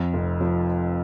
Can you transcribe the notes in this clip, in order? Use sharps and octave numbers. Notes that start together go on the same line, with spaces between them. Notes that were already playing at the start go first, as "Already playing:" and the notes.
Already playing: F2
F1
F3